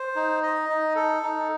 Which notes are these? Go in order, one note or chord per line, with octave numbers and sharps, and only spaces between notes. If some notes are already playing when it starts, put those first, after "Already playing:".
Already playing: C5
D#4
D#5
D#4
A4
D#4